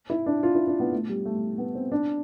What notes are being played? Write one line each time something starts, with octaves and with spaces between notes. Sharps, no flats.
E4
D4
F4
E4
D4
B3
A3
G3
A3
B3
C4
D4